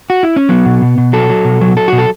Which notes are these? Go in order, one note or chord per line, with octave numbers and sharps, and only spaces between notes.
F#4
E4
C#4
F#3 B3
B2
B2
B2
F#3 A4
F#3
B2
F#3
F#3 A4
B2 F#4
A4